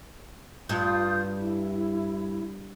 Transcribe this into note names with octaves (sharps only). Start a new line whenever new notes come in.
G2 F4 D#6 G6
E4